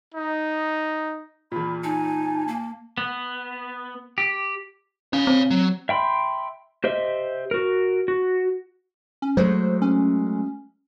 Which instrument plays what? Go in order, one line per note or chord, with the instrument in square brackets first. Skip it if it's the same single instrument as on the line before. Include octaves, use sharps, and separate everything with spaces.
[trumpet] D#4
[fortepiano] E2 A#2 [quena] B5
[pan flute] D#4 [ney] G#5 [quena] A5
[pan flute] A#3
[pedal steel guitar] B3
G4
[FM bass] C#4 [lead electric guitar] C#5 F5
[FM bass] C4
[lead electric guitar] F#3
[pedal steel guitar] E5 G5 B5 C6
G4 C5 D#5 E5
F#4 A#4
F#4
[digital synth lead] C#4
[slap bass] F#3 G#3 A3 [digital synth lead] C5
[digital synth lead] C#4